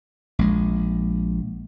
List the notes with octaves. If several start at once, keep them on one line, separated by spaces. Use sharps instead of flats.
A#1 G#3